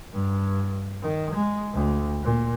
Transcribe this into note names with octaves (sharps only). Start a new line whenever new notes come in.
G2
D#3
G#3
D2
A#2